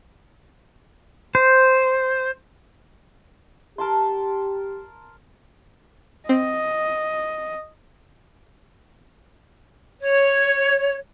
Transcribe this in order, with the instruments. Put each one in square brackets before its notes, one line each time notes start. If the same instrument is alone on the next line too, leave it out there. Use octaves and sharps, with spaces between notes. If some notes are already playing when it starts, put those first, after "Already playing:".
[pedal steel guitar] C5
[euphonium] G4 [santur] A#4 A5 C6
[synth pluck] C4 [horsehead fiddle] D#5
[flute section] C#5